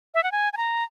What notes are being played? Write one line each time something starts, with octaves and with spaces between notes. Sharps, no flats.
E5
F#5
G#5
G#5
A#5